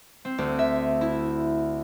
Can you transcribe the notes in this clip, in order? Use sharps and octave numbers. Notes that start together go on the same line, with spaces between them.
C4
D2
E5
E4